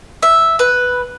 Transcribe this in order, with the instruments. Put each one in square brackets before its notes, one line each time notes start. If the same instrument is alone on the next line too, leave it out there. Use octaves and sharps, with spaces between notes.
[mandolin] E5
B4